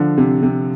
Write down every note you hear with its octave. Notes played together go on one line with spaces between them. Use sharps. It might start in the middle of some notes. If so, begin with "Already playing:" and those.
Already playing: D3 F3
C3
C3